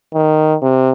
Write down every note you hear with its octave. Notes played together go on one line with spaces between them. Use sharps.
D#3
C3